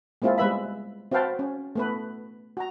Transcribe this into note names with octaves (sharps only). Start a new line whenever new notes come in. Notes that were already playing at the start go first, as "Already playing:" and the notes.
G#3 A#3 C4 E4 F4 G#4
G3 G#3 B3 B4 E5 B5
C4 F#4 B4 F5 G5 A5
C#4
A3 B3 B4
F#4 A#5